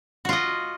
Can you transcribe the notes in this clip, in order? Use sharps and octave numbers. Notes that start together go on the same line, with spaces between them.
F4 F#4 D#5